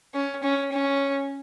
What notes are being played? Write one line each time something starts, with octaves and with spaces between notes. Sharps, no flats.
C#4
C#4
C#4